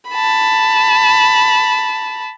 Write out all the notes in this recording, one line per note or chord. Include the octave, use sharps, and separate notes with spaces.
A5 B5